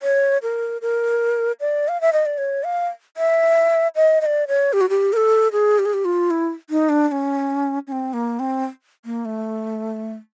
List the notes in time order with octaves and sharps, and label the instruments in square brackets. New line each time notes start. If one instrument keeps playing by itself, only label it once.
[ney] C#5
A#4
A#4
D5
F5
E5
D#5
D5
C#5
F5
E5
D#5
D#5
D5
C#5
G4
F#4
G4
A#4
A4
G#4
G4
G#4
G4
F4
E4
D#4
D4
D4
C#4
C#4
C4
A#3
C4
A#3
A3